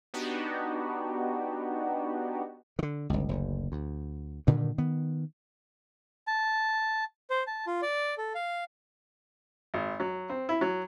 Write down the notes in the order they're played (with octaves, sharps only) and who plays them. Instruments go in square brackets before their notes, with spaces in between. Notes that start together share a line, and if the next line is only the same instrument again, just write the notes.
[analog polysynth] B3 D4 D#4 F#4 G4
[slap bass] D3 D#3
G1 C#2
F#1 D2
D2
G2 A#2 D3 D#3
D#3 B3
[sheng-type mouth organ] A5
C5
A5
F4
D5
A4
F5
[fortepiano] G#1
F#3
C4
E4
F#3